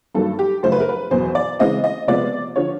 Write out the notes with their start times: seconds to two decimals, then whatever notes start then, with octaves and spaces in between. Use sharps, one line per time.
0.15 G2 D#3 F#3 A#3 A4
0.39 G4
0.63 F#2 C#3 F3 A3 C5
0.72 B4
0.80 A#4
0.89 B4
1.11 E2 B2 F#3 C5
1.35 D5
1.59 C#3 E3 G#3 C4 D#5
1.84 D#5
2.08 C3 F3 G#3 B3 D5
2.56 D3 F3 C#5